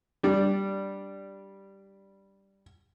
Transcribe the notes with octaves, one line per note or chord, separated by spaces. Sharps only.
G3 D4